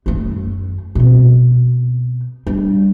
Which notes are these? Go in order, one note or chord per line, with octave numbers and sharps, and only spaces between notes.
F#2 A3
B2 C4
G3 D4